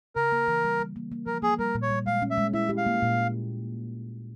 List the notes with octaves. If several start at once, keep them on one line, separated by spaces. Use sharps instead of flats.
C#3 A#4
A#3
E3
G3
G3
A#3
A#3
F3 A#4
A#3 G#4
G3 A#4
A#2
C#5
G3
G#3 F5
C#4
E5
G#3
E4 E5
G4
F5
A#3
A#2